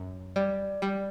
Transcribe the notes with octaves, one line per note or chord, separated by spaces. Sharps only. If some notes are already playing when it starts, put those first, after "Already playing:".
Already playing: F#2
G3 D5
G3